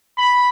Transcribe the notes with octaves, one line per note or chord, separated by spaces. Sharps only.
B5